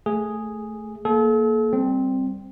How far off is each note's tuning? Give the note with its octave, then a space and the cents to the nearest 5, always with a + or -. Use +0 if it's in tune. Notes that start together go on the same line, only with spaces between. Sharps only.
A3 +0 G#4 +0
A#3 +0 A4 -40
G3 +0 C4 +0